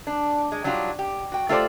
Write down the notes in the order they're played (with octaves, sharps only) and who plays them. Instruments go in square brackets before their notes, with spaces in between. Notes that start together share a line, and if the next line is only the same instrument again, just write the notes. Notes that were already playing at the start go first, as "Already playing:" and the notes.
[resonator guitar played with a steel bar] D4
G#3
F#3 G3 D4 D#4 F4
G4
F#4 G5
A3 F4 G4 A4 C5 D5